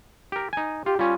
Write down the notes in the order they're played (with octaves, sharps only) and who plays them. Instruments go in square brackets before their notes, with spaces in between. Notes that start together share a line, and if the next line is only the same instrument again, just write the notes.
[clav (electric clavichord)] G4 A#4
D#4 G#5
[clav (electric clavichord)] F4 [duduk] G4
[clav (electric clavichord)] G3 C#4 [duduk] F4